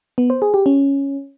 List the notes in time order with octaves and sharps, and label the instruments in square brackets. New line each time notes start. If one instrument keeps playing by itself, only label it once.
[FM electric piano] B3
C5
G#4
G4
C#4